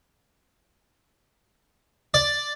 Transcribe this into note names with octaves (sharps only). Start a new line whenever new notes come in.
D5